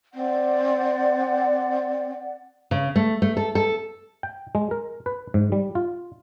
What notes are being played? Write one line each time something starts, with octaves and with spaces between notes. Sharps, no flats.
C4 D5 F#5
C#3
A3
A3
A4
A4
G5
G#3
A#4
B4
G#2
G3
F4